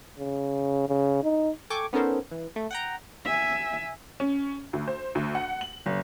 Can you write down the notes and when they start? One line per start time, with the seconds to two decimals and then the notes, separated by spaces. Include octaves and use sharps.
0.19 C#3
0.89 C#3
1.23 D#4
1.70 A4 G5 G#5 C#6 D6
1.93 B3 C#4 D#4 A4 A#4 C5
2.31 E3
2.56 A3
2.71 F#5 G5 A#5
3.25 E5 G#5
4.20 C#4
4.73 D2
4.88 C5
5.15 D2
5.35 F#5
5.61 F#7
5.86 F#1